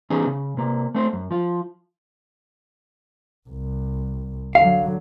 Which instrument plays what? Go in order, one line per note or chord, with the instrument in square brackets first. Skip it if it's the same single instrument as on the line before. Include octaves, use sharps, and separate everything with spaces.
[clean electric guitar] E3 B3 C#4 D#4 G#4
C#3
C3 A#3
A3 C4 C5
F#2
F3 F4
[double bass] C2
[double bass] D3 F#3 [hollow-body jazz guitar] F5